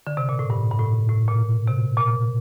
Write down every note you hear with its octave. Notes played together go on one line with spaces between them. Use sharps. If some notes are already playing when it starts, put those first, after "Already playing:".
D3
C3
A#2
A2
G2
G2
A2
A2
A#2
C3
A#2